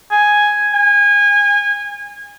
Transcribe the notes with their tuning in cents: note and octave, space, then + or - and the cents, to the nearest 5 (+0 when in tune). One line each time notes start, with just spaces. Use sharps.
G#5 +0
G#5 -25